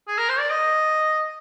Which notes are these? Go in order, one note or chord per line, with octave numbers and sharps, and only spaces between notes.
G#4
A#4
C5
D5
D#5